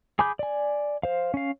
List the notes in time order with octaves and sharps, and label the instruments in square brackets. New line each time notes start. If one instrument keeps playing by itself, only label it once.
[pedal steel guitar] G#4 G#5 B5 D6 G6
D5 G#5
C5 F5
C#4 F5